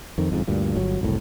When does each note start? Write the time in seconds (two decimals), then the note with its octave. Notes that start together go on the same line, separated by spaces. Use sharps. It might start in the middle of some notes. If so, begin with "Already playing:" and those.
0.18 F2 D#3
0.30 G1 F2 G#2
0.48 D2 G2 A#2
0.75 G1 F#3
1.01 F#1 C2 A2